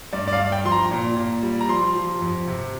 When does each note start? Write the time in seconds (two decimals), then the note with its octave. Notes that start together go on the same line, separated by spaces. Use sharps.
0.13 G2 D5
0.28 D5
0.33 F5
0.38 G2
0.52 G5
0.65 F3 C6
0.72 A#5
0.91 A#2
1.16 A#2
1.43 G3
1.61 A#5
1.69 F3 C6
1.95 F3
2.21 F2
2.47 C3